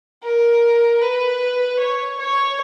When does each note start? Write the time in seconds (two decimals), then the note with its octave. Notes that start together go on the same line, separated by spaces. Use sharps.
0.23 A#4
1.01 B4
1.80 C#5
2.19 C#5